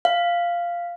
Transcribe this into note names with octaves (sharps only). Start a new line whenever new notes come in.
F5